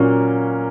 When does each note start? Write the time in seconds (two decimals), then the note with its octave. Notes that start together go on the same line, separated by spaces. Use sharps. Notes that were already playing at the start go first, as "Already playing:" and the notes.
Already playing: A#2 F#3 A#3 C#4